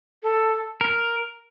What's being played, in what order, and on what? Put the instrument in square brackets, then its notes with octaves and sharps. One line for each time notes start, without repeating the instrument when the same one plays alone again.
[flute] A4
[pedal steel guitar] A#4